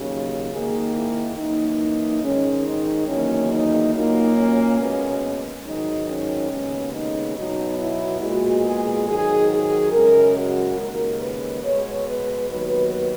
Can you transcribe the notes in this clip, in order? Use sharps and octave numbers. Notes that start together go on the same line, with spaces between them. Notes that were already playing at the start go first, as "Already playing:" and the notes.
Already playing: D#2 C#3 F#3
G#2 D#3 A#3 G#4
E4
F#2 E3 A#3 D#4
G#2 D#3 G#3 C#4
D#4
E2 D#3 F#3 A#3 C#4
D#4
A#2 F#3 A#3 D#4
C#4
B2 G#3 B3
G#2 D#3 F#3 D#4
C#4
D#2 C#3 G#3 B3
D#4
B2 F#3 B3 D#4
E4
A#2 G#3 B3 F#4
G#4
G#2 D#3 F#3 G#4
G#4
F#2 C#3 G#3 A#4
F#4
D#2 C#3 G#3 A#4
B4
B2 G#3 B3 C#5
B4
D#2 D#3 F#3 B3 B4